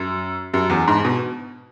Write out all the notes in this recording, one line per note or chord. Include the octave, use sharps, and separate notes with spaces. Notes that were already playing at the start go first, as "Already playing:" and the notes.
Already playing: F#2
F#2
E2
G#2
B2